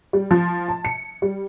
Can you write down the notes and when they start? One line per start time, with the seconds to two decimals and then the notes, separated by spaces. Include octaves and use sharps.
0.13 G3
0.31 F3
0.68 A5
0.85 C#7
1.22 G3